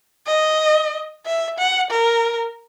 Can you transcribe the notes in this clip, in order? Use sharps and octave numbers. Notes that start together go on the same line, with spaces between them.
D#5
E5
F#5
A#4